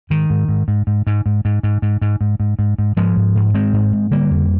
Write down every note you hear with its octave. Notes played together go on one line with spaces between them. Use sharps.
G#2 D#3
G#2
G#2
G#2
G#2
G#2
G#2
G#2
G#2
G#2
G#2
G#2
G#2
G#2
G#2
G#2 F3 G#3
G#2
G#2
G#2 G#3 C4
G#2
G#2
D3 G3 A#3
F2